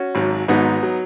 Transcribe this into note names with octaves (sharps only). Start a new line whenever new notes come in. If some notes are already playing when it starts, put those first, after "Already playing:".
Already playing: C#4 F#4
G#1 G#2 F#3
G#1 G#2 F#3 B3 D#4
F#3